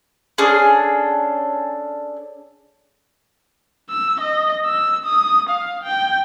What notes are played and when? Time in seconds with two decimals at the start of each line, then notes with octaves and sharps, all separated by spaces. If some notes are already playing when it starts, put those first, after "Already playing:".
0.38 C#4 D4 G#4 A4
3.90 E6
4.20 D#5
4.65 E6
5.05 D#6
5.49 F5
5.83 G5